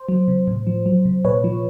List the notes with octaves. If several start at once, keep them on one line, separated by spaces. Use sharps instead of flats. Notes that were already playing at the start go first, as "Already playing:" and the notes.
Already playing: C5
F#3
C3
A2
F3
F#3
C3
A#2 B4 C#5
F3